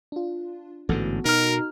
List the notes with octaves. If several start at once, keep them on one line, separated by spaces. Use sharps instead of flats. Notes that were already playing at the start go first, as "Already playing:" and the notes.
D4 F4
A1 G#2 D3 B3 F#4 A4
B2 D#4 A#4 F6